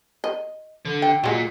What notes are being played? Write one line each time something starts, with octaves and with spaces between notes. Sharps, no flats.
D#5
D3
G5
A#2 F#3 G#3